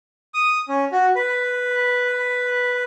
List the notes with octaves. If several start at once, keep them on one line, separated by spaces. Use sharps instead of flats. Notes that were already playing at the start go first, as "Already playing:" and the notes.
D#6
C#4
F#4
B4